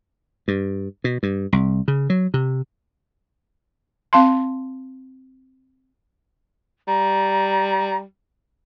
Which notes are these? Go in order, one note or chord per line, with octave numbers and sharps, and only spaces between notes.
G2
B2
G2
C2
C#3
F#3
C3
C4 F5 A5 C6
G3 A#5